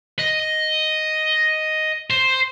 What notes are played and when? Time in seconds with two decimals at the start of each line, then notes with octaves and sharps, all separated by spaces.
0.19 D#5
2.10 C5